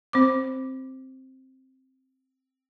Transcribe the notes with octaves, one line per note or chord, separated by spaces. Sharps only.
C4 C5 D6